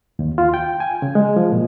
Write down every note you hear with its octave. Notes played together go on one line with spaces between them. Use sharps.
D#2
F4
G5
G#5
C#3
G#3
F3
A#2